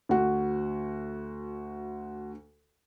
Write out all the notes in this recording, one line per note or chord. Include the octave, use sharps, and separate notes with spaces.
D2 F#4